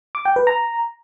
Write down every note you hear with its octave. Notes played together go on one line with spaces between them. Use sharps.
D6
G5
B4
A#5